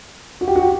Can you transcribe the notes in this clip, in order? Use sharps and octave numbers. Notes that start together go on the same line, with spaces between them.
F#4
G4
F#4
G4